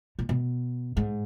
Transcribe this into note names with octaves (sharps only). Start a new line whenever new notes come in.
A#2
B2
G#2